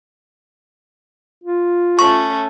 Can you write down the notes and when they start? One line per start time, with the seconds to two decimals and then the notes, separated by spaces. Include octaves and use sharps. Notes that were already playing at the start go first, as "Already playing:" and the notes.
1.43 F4
1.99 A3 C#4 C#6